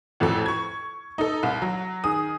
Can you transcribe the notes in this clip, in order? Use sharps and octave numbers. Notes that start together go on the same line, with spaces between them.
A1 F2 F#4 A4
C#6 G#6
D#4 A4
C2
F#3
D#3 G#4 D#6